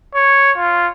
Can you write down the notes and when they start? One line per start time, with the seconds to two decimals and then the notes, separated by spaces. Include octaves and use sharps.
0.15 C#5
0.57 F4